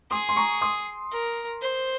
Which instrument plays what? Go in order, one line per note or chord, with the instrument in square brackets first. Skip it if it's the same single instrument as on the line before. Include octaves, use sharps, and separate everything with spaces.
[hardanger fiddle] G#4 [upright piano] C6 D#6
[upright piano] C6
A#5 C#6
C6 D#6
[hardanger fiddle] A#4
C5